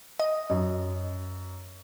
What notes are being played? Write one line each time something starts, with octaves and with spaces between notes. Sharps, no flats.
D#5
F#2